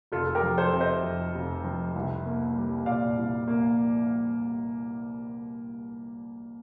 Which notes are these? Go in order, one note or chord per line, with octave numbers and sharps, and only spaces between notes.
F1 F4 A4
A4
G4 A#4
F3
A4 C5
C3
C5 D#5
F2
F1
F3
C2
A#3
G3
A#2 D5 F5
C2
A#3